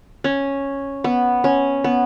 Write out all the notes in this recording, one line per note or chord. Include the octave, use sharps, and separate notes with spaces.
C#4
B3
C#4
B3